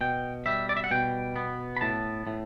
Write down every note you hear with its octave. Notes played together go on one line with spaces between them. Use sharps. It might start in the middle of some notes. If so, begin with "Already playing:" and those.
B2 G5
G3 E5
D5
E5
F#5
B2 G5
B3
B5
A2 A5
A2